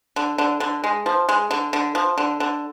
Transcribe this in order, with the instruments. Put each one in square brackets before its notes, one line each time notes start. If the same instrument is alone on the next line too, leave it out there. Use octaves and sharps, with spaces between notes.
[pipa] D3
D3
D3
G#3
F3
G#3
D3
D3
F3
D3
D3